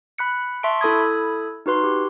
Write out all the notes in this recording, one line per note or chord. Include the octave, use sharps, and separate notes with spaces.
B5 F#6 C#7
E5 A5 C6 C#6 D7
E4 A4 B5 D#6 G#6
D#4 F#4 B4 C6
G4